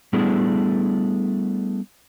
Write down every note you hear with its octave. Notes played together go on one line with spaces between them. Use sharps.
G3 A3 B3 D4 E4 G#4